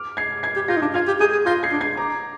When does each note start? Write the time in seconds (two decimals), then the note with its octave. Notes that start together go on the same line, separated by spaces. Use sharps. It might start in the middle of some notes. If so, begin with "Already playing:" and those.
Already playing: D6 F6
0.17 G#6 C7
0.43 G#6 C7
0.56 G4
0.68 F4 G6 A#6
0.77 D#4
0.82 D4
0.94 F4 F6 G#6
1.07 G4
1.20 G#4 D#6 G6
1.33 G#4
1.46 F4 G6 A#6
1.63 G#6 C7
1.72 D4
1.81 G#6 C7
1.97 A#5 D6